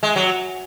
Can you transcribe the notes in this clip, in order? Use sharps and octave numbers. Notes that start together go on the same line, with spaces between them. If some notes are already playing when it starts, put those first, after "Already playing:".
G#3
F#3